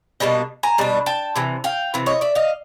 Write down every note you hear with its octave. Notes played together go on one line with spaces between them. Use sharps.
B2 G3 A#3 D4 D#5
G#5 A#5
B2 G3 D4
G5 A5
C3 E3
F5 G5
C3 E3
C#5 D#5
D5 E5
D#5 F5